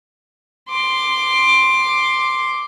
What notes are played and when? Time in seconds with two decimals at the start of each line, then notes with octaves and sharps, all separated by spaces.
0.69 C6 D6